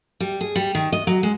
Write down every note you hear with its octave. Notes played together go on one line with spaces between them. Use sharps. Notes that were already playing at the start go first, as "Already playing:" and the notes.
G3
G#4
G3
D#3
D#5
F#3
G#3